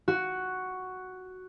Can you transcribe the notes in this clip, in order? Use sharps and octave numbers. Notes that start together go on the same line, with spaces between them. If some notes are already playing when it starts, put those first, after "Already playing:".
F#4